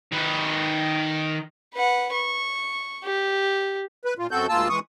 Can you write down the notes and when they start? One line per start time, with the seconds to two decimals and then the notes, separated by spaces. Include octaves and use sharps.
0.12 D#3 B4
1.74 B4 F#5
2.14 C#6
3.04 G4
4.05 B4
4.19 A#2 F4
4.31 F#2 C4 F#4 A4 G6
4.49 D2 G#2 A#3 F4 A5 E6
4.69 E3 G#3 C#6 D#6